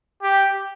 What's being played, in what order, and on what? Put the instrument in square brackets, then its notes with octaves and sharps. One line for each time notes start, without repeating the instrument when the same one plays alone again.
[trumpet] G4